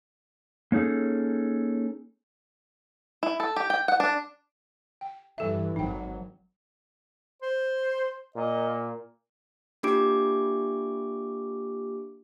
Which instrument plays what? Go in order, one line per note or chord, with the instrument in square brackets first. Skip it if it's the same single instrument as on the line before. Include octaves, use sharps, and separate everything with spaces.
[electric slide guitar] A#3 C#4 D#4 G#4 A4
[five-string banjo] E4
A4
G4
G5
F#5
D4
[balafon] G5
[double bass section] G2 E3 [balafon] A4 E5
[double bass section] G#1 F#3 [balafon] D#4 G5
[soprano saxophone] C5
[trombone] A#2 [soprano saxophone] D#5
[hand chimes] A#3 D4 F4 G4 D6 D7